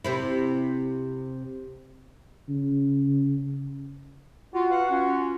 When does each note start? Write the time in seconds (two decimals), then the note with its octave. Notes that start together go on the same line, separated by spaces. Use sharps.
0.05 C3 C4 E4
2.49 C#3
4.54 F4 F#4
4.70 B4 F5 F#5
4.89 C#4 F4